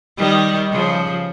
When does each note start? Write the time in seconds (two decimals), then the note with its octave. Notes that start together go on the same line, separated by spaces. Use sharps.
0.17 D#3 G3
0.72 C#3 F3